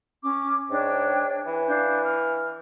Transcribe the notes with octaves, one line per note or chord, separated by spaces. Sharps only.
C#4 D6
G#2 D4 C#5 G5
E3
D4 F5 G6
F6